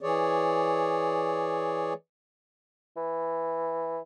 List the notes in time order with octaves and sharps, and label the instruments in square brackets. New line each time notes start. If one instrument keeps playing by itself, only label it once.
[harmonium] E3 G#4 C#5 D5
[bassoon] E3